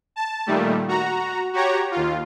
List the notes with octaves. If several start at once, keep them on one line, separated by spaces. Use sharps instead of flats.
A5
A#2 D#3 G3 A3
F#4 A#5
F#4 G4 C#5 A#5
D#2 F4